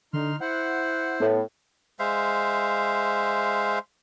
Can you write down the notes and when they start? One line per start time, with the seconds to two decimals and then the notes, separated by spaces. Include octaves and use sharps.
0.13 D3 D#4 C6 F6
0.40 E4 C5 F#5
1.20 A2 B3
1.99 G#3 C5 E5 F5